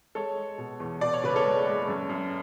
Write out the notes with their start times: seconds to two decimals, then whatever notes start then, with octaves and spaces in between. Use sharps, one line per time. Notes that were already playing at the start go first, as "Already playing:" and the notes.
0.15 G#3 A4 C#5
0.37 G#3
0.58 B2
0.80 E2
1.01 B2 D5
1.13 C#5
1.24 F#1 B4
1.36 A4 C#5
1.45 G#3
1.67 G#3
1.88 F#2
2.09 F#2